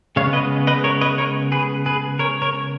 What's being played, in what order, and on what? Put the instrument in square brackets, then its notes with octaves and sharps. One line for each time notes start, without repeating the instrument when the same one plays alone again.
[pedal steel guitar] C#3 G#3 B3 C#5 F5
B4 D#5
B4 D#5
A#4 C#5
B4 D#5
A#4 C#5
G#4 B4
G#4 B4
A#4 C#5
A#4 C#5